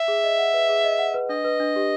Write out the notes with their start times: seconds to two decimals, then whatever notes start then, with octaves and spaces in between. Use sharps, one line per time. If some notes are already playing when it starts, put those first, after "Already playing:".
Already playing: E5
0.08 G#4
0.24 D#5
0.38 F#5
0.53 B4
0.69 G#4
0.84 D#5
0.99 F#5
1.14 B4
1.29 D4 D#5
1.45 B4
1.60 D4
1.76 G4